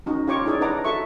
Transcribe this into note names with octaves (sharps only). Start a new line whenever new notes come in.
C#4 D#4 F#4
F4 G4 C#5 C#6 D6
D#4 E4 G#4 C#5 D5
D4 B4 D#5 F#5 A#5 D6
F#4 A4 E5 C#6